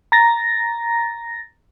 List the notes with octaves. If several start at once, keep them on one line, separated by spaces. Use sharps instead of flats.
A#5 A6 A#6